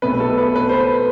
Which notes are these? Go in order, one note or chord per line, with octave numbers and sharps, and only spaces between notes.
B1 B2 A3 B4
A4
B4
B4
C5
B4